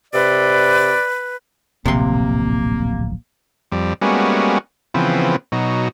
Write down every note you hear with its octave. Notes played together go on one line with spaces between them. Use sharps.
C3 B4 D5
D1 A#1 C3 A#3 C6
F2 G3
G3 G#3 A#3 B3 C#4 F#4
C#3 E3 F3 B3 C4
B2 F#3 D#4